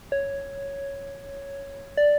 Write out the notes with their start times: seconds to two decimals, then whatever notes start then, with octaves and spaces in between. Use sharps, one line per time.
0.12 C#5
1.97 D5